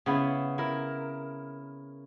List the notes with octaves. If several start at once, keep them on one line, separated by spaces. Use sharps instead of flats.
C#3 B3 E4
E4 A#4